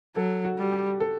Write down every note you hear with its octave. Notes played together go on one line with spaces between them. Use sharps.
F#3 A4
F#4
G3
G4
A4